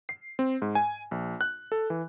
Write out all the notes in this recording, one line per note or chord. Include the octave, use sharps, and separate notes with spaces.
C7
C4
G#2
G#5
A#1
F#6
A4
E3